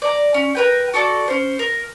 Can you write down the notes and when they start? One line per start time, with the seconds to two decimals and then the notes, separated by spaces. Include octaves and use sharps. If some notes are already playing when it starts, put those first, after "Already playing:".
0.02 D5 A#5
0.34 C#4
0.55 A#4 B4 G5
0.94 F#4 A4 D5 A5
1.28 C#4 C5
1.59 A#4